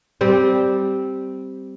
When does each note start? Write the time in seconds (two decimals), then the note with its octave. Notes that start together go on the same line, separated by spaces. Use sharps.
0.21 G3 C4 C5